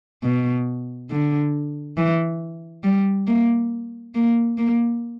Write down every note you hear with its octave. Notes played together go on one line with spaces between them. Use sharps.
B2
D3
E3
G3
A#3
A#3
A#3